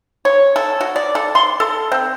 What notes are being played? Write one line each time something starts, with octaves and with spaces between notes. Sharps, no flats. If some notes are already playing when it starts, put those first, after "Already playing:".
C#5
A4
F#4
D5
A4
C6
A4
C4